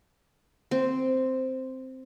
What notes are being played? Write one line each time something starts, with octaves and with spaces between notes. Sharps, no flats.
C4